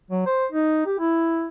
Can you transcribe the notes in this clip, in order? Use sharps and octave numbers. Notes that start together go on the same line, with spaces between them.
F#3
C5
D#4
G4
E4